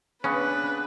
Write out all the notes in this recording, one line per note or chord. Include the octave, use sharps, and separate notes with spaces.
C#3 B3 C#4 D4 B4 F#6